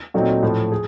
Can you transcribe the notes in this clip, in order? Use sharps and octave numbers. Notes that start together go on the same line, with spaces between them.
A#2 F#3 A3 C4 D#4
A2 F3 A3
G#4